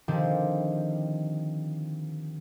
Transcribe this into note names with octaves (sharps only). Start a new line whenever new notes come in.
D3 D#3 F3 C4 G4